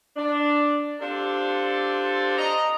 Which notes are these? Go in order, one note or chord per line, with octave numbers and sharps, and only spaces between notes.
D4
C4 D4 F4 G4 A4 D5
D#5 A#5